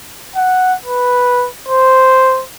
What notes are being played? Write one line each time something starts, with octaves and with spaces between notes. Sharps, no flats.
F#5
B4
C5